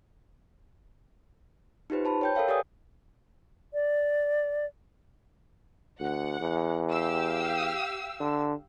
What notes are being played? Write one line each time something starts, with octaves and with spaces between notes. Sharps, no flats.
D#4 F4 G4 B4 C5
C5 A5 B5
C#5 G5 G6
A4 A#4 C#5 E5 F5 G5
G4 A4 B4 D5 G#5 D#6
D5
D2 F#5
E2
G4 F5 E6
D3